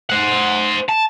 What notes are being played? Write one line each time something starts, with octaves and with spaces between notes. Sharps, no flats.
C5 F#5
A5